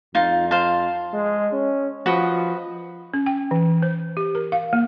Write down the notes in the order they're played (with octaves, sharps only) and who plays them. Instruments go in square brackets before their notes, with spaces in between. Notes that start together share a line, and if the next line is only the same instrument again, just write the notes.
[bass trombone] F2 [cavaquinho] D#4 F4
[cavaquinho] C5 F5 A5
[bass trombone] G#3
C#4
[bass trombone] F3 [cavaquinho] F#4 B4 D#5
[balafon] C#4
G5
E3
C5
G4
A#4
F5
A#3